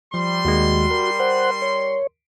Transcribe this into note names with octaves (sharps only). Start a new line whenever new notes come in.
F3 G3 C6
D#2 D#3 G#3 F#4
A#4
C5 F#5
C#5